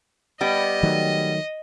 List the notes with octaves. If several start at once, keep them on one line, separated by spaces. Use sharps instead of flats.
G3 B3 G4 D#5
D#3 F#3 A3